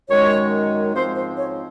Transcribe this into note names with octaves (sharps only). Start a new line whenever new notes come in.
F#2 D#3 G#3 C#4 C#5
G#2 F3 C4 C5
C5
C#5